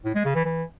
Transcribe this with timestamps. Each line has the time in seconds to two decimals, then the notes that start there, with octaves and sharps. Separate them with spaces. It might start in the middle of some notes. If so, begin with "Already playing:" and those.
0.05 A2
0.15 G#3
0.25 C#3
0.35 E3
0.45 E3